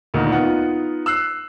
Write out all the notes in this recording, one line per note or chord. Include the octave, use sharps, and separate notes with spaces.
D2 A#2 D#3 D#4
B3 D#4 F4 F#5
E6 F#6 C7